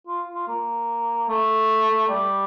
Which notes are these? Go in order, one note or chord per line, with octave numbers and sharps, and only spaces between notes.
F4
F4
A#3
A3
G3